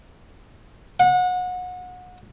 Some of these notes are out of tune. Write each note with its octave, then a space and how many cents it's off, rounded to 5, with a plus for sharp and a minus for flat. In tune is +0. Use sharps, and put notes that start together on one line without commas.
F#5 -30